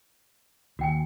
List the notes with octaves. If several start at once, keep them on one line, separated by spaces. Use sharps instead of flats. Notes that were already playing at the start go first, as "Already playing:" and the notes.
D#2 F#4 G5 G#5